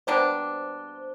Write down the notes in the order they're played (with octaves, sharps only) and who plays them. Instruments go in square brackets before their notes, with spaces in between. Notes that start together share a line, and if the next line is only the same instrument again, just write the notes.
[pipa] B2 G3 A#3 D4 [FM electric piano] C5